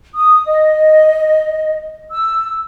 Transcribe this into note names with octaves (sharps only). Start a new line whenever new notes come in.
D#6
D#5
E6